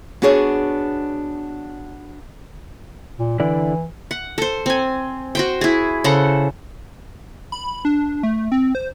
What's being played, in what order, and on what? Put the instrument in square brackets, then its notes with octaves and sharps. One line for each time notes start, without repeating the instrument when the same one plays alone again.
[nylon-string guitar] B3 D4 F#4 G#4 C#5
[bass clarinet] A#2
[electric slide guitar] D3 E4 D5 [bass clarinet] E3
[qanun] F#5
A4 C5
C4 G#5
F#4 C5 G5
E4 G#4
C#3 A4 C5 F#5
[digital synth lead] B5
D4
A3
C4
C5